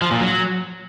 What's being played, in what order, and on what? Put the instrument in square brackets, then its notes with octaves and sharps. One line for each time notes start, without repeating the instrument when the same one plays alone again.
[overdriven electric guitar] F3
A#2
F#3